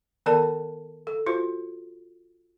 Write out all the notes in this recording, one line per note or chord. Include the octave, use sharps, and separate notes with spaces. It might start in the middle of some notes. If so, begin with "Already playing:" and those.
D#3 B3 A4 A#4 D5 A5
A4
F4 F#4 C5